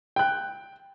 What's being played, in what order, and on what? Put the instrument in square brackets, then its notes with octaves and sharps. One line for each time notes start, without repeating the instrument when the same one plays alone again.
[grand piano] G5 F#6